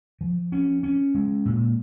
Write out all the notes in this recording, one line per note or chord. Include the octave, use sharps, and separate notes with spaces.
F3
C#4
C#4
G#3
A#2